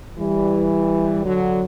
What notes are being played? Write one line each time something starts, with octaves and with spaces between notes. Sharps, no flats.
E3 G3
D3 F#3